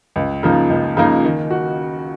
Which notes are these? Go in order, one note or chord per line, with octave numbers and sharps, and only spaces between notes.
C#2
C#3 F3 A#3 D#4
C#2
C#3 F3 A#3 D#4
D#3
F#4